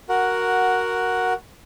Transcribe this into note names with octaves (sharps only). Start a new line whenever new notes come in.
F#4 A#4 F#5